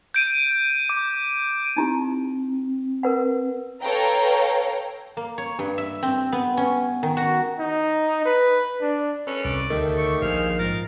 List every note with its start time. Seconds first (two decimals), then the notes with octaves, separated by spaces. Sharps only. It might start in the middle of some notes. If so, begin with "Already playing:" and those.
0.14 G6 D7 D#7
0.90 D6
1.76 C4 D#4 E4 G4
3.03 A#4 B4 F#5
3.82 A4 B4 C#5 F5 G5 A#5
5.17 A#3
5.38 C#5
5.59 G2
5.78 E5
6.03 C4
6.32 B3
6.57 C#4
7.03 D#3
7.17 F#4
7.59 D#4
8.25 B4
8.81 D4
9.27 C#4 A4 B4
9.45 C2 D5
9.70 D2 D#3 A3 G4 A4
9.98 C#6
10.22 A#1 G#4 C5 F5
10.59 G#2 F3 A#4 A6